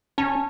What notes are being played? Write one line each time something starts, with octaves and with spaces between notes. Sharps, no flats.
C#4 A5